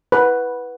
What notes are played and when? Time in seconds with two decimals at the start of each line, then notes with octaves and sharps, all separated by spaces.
0.12 B4